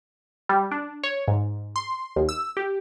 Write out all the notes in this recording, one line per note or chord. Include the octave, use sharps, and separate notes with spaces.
G3
D4
C#5
G#2
C6
D#2
E6
G4